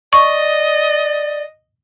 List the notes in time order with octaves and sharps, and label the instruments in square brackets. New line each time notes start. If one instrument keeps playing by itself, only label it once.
[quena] D5 [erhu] D#5 [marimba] C#6